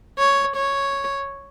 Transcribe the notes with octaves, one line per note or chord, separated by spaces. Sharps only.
C#5
C#5